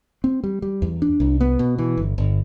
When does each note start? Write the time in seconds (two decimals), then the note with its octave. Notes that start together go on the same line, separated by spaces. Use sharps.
0.24 C4
0.44 G3
0.62 G3
0.82 E2
1.02 D4
1.20 C2
1.41 B3
1.59 B2
1.78 E3
1.97 G1
2.18 G1